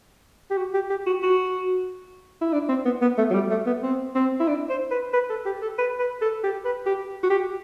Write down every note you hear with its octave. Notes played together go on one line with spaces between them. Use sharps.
G4
F#4
G4
G4
F#4
F#4
E4
D4
C4
B3
B3
A3
F#3
G3
A3
B3
C4
C4
E4
D4
C5
B4
B4
A4
G4
A4
B4
B4
A4
G4
B4
G4
F#4
G4